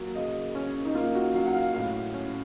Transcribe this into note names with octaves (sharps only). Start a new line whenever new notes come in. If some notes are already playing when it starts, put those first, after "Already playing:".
Already playing: F#3 A#3
C#3 D#5
C#4
D#4
A#3 F4
F#4
F#3 F5
F#5
F5
A2 F5
C#4